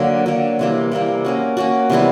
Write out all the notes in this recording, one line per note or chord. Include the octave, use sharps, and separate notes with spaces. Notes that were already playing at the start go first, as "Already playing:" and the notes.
Already playing: D3 F#3 A#3
D3 F#3 A#3
C3 E3 G3 A#3
C3 E3 G3 A#3
A#3 C#4 F#4
A#3 C#4 F#4
C3 E3 G3 B3